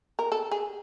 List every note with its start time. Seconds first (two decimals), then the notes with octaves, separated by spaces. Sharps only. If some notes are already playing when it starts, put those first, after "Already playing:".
0.19 A#4
0.32 A4
0.51 G#4